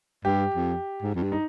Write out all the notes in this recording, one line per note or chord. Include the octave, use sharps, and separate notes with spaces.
G2 G4
F2
G#2
F2
G2
D#4